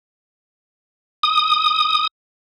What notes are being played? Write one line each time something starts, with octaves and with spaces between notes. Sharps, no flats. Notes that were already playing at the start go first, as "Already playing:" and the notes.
D#6